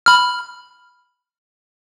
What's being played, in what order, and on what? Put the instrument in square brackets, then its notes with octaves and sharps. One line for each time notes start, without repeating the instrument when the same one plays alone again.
[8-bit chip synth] B5 F6